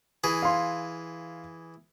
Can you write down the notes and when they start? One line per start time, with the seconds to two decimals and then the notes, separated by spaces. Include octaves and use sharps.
0.24 E3 G#4
0.42 F5 C6